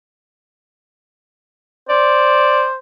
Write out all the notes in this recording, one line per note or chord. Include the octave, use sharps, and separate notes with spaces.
C5 D5